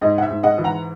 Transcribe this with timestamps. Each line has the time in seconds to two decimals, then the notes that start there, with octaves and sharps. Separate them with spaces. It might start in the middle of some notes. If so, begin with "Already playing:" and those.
0.01 G#2 D#5
0.18 F#5
0.23 E5
0.30 G#2
0.43 D#5 F#5
0.58 E3
0.64 F#5 A#5